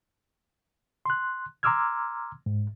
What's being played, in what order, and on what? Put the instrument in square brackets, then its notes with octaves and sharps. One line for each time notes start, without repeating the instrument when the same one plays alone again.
[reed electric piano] C6 F#6
A#5 C6 D6 E6 F6 G#6
G#2